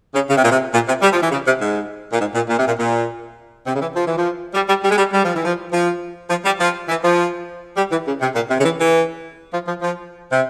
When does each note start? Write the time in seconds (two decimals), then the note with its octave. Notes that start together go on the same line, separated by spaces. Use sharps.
0.14 C#3
0.29 C#3
0.37 C3
0.44 A#2
0.51 C3
0.73 A#2
0.87 C3
1.02 G3
1.12 F3
1.22 E3
1.31 C#3
1.46 C3
1.61 G#2
2.13 A#2
2.19 G#2
2.35 A#2
2.49 A#2
2.58 C3
2.67 A#2
2.78 A#2
3.67 C3
3.74 C#3
3.81 E3
3.95 F3
4.07 E3
4.18 F3
4.54 G3
4.68 G3
4.83 G3
4.91 G#3
4.98 G3
5.13 G3
5.24 F3
5.34 E3
5.45 F3
5.71 F3
6.30 F3
6.44 G3
6.59 F3
6.89 E3
7.04 F3
7.77 G3
7.91 E3
8.06 C#3
8.21 C3
8.35 A#2
8.49 C3
8.59 C#3
8.64 E3
8.79 E3
9.52 F3
9.67 F3
9.81 F3
10.31 C3